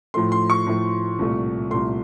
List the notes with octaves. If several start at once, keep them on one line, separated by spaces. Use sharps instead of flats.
A2 F3 A3 C6
C6
C#6
A2 F3 A3
C2 A#2 A3
C2 A#2 A3 C6